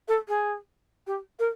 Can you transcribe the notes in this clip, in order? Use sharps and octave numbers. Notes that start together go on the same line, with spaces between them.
A4
G#4
G4
A#4